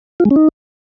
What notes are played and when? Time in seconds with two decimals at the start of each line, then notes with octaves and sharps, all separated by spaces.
0.20 F4
0.25 G#3
0.31 C#4
0.36 D#4